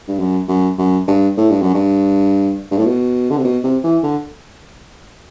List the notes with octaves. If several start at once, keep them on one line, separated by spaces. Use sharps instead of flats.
G2
F#2
F#2
F#2
G2
A2
G2
F#2
G2
G2
A2
B2
D3
C3
B2
C3
E3
D3